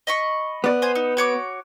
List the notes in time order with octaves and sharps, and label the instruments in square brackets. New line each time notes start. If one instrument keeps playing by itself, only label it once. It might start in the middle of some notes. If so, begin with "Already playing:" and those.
[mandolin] D#5 B5 C#6
[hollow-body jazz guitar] B3 D5
[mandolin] C5 G#5
D#4
F#4 C#5 D6